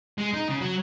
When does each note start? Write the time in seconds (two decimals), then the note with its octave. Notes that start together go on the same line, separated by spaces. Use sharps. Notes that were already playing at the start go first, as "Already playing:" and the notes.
0.18 G#3
0.34 D#4
0.49 C#3
0.61 F#3